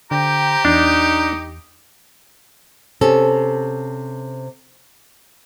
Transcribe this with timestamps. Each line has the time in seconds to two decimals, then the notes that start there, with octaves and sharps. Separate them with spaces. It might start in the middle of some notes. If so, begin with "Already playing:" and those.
0.11 D3 G4 C5 G5 A#5
0.65 E2 D4 D#4
3.01 C3 C#4 A4